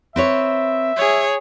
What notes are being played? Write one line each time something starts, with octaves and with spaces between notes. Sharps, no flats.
C4 B4 C#5 E5
G#4 C#5